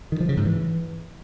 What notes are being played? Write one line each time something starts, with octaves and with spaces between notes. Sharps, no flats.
D#3
F3
C#3
G#2
E3